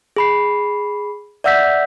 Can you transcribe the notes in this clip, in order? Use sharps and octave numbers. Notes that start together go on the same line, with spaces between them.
G#4 B5 C7
D5 E5 F#5 E6 G6 B6